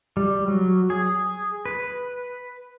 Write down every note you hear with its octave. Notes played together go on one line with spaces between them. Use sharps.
G3
F#3
G#4
B4